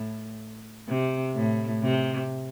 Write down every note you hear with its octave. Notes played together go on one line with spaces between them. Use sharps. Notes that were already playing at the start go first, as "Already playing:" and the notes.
Already playing: A2
C3
A2
C3